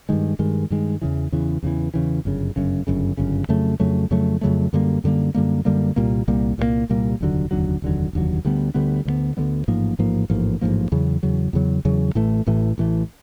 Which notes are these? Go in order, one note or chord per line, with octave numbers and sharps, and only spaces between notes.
G2 D#3 G#3
G2 D#3 G#3
G2 D#3 G#3
E2 C#3 E3
E2 C#3 E3
E2 C#3 E3
E2 C#3 E3
G1 F#2 C#3
G1 F#2 C#3
G1 F#2 C#3
G1 F#2 C#3
F2 C#3 F#3 A3
F2 C#3 F#3 A3
F2 C#3 F#3 A3
F2 C#3 F#3 A3
F#2 D3 G3 A#3
F#2 D3 G3 A#3
F#2 D3 G3 A#3
F#2 D3 G3 A#3
C2 A#2 G3 A#3
C2 A#2 G3 A#3
C2 A#2 G3 A#3
C2 A#2 G3 A#3
F1 D#2 D3 F#3
F1 D#2 D3 F#3
F1 D#2 D3 F#3
F1 D#2 D3 F#3
D2 D3 G3 B3
D2 D3 G3 B3
D2 D3 G3 B3
D2 D3 G3 B3
A1 G#2 F3 A#3
A1 G#2 F3 A#3
A1 G#2 F3 A#3
A1 G#2 F3 A#3
E2 C#3 F#3
E2 C#3 F#3
E2 C#3 F#3
E2 C#3 F#3
A1 A2 E3 A3
A1 A2 E3 A3
A1 A2 E3 A3